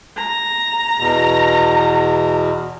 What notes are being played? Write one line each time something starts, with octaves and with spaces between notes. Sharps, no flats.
A#5
E2 B2